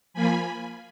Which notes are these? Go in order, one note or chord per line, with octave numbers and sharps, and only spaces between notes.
F3 A#3 F4 G#5 B5